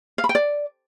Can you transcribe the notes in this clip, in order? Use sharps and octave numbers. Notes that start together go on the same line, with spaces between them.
F5
B5
G5
D5